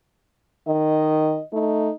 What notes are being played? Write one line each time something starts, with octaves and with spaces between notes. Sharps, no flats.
D#3 D#5
A3 D#4